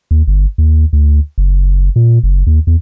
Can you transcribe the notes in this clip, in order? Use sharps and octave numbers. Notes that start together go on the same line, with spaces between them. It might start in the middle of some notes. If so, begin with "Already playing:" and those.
D#2
G1
D#2
D2
F#1
A#2
F#1
D#2
E2